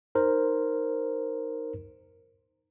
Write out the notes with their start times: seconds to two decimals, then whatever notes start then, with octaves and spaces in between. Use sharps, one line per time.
0.15 D#4 A#4 C5